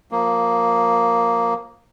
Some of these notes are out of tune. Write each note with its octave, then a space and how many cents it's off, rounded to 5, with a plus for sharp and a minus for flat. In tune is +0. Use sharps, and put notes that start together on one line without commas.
F3 +20 A#3 +0